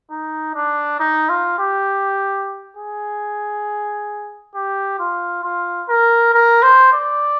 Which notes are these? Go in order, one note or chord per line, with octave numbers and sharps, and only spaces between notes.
D#4
D4
D#4
F4
G4
G#4
G4
F4
F4
A#4
A#4
C5
D5